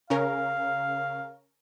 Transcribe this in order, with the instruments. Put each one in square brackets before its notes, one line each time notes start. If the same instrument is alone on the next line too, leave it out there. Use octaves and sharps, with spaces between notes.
[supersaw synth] C#3 C#4 A#4 [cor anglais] F5